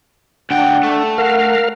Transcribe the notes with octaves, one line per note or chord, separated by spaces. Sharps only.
D2 D4 F#5 G5
A3
A#4 F5 F#5